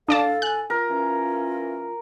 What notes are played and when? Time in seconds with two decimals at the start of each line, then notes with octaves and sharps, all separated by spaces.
0.08 A2 D4 A4 D5 F5 A5
0.42 G#5 F#6
0.70 F4 A#4
0.90 E3 A#3 C#4